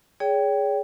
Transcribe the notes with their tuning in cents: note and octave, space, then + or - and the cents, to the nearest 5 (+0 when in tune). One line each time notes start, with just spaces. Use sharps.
G#4 +0 C#5 +40 G5 +0